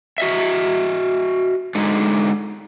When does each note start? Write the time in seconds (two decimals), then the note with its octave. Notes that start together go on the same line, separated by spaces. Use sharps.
0.18 F#4 D#5 E5
1.75 D3 G#3 D#4